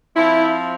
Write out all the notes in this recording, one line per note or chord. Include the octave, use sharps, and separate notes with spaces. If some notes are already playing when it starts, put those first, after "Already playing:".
F3 C4 E4